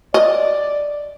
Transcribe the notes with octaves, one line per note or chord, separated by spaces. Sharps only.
D5 D#5